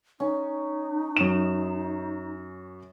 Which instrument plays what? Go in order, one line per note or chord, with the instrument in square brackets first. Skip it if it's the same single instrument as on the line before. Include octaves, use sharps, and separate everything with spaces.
[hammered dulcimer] C#4 [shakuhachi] D#4
[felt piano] F#2 E7